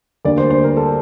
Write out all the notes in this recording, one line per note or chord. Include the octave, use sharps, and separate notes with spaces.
D2 D3 G3 A#3 D5
C5
C5
A#4
A4